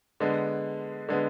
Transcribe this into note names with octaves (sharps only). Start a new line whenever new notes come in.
D3 G#3 B3
D3 G#3 B3